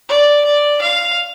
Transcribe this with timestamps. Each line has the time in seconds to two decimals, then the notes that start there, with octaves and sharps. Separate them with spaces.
0.09 D5
0.45 D5
0.81 F5